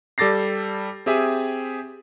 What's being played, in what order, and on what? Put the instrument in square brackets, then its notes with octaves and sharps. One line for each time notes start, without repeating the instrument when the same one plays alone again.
[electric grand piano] G3 A4 D6 A6 A#6 C7
C4 G4 G#4 E5 G#5